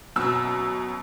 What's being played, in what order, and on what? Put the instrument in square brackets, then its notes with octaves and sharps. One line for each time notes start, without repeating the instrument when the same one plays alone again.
[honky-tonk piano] F#2 B2 E6